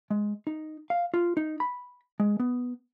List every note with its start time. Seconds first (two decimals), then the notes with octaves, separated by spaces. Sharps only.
0.10 G#3
0.47 D#4
0.90 F5
1.14 F4
1.37 D#4
1.60 B5
2.20 G#3
2.40 B3